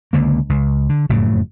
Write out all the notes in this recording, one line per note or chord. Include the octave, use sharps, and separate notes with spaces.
C#2 D3 A#3
C#2
D3
F#1 F2 A2 C#3